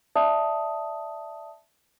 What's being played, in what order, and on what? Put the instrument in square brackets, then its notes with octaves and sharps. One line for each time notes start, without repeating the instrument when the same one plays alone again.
[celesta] D5 E5 A5 D#6